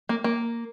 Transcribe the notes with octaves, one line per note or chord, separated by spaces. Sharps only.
A#3
A#3